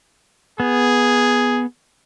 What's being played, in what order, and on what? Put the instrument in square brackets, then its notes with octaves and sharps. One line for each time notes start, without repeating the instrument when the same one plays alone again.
[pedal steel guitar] B3 [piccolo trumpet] G#4